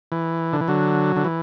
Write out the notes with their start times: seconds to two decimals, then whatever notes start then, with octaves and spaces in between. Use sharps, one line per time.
0.12 E3
0.53 D3
0.61 E3
0.68 D3 F#3
1.16 D3
1.24 E3